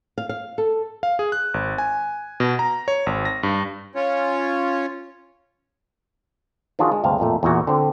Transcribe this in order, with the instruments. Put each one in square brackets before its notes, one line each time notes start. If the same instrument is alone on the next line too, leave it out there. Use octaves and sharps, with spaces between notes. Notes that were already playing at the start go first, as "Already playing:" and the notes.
[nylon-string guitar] F5
F5
A4
[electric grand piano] F5
G#4
F#6
G#1
G#5
B2
A#5
C#5
G#1
A#6
G2
[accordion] C#4 F4 C#5
[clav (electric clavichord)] D#3 F3 D4 F4 F#4 G#4
G#3
D2 G2 C3 G3 G#3 F5
A1 F2 A#2 A3
E2 A#2 F#4
D3 C4